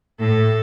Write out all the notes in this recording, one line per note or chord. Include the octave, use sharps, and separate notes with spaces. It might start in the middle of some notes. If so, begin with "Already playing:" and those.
A2 A4